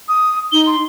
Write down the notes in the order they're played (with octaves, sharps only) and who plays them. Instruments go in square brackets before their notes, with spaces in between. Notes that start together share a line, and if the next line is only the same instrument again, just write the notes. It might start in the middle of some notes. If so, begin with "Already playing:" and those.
[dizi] D#6
[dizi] D#4 [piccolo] G7
[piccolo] C6